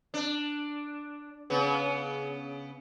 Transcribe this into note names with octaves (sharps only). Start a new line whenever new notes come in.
D4
C#3 B3